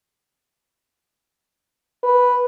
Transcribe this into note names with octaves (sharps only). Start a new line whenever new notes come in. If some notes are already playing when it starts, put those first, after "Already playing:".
B4